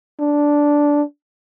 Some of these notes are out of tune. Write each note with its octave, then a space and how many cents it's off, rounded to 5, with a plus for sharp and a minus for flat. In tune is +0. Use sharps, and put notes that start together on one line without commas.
D4 -5